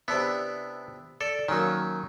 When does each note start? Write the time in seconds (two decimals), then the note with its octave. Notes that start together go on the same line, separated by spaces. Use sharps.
0.08 C3 B3 D4 E4
1.21 A4 D5
1.48 D#3 F#3 A#3 C#4